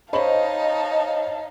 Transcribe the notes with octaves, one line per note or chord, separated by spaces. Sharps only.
D#4 C5 C#5 D#5 F5 A5 B5